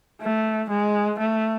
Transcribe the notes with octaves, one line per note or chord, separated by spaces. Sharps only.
A3
G#3
A3